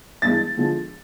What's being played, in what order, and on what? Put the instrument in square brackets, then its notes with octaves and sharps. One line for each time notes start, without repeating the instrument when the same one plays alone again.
[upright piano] G2 E3 G#3 A6
D3 F3 G#3